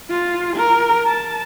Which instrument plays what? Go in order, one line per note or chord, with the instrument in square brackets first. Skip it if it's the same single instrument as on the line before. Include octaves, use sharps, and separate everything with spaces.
[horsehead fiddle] F4
A#4
A5